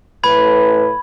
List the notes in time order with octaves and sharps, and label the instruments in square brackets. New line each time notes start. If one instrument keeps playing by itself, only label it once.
[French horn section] A2 B4 [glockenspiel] B5 G#6